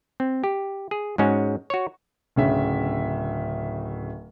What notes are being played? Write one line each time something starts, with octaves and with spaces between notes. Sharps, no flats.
C4
G4
G#4
G#2 G#3 C#4 F#4
F#4 C#5
D1 C#3 E5